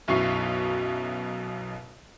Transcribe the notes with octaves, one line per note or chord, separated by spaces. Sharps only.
B1 F#2 B2 E4 C#6 C7